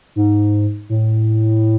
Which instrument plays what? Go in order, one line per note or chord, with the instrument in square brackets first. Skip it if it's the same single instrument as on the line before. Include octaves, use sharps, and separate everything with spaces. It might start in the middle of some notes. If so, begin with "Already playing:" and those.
[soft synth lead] G#2
A2